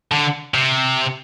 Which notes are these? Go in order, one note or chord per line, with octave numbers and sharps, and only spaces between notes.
D3
C3